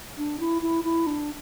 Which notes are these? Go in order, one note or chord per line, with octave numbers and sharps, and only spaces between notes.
D4
E4
E4
E4
D4